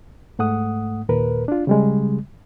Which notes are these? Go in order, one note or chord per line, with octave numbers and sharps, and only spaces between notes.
G#2 A3 F#5 D#6
D#2 A#2 A#4 B4
D4 F4
C#3 G3 G#3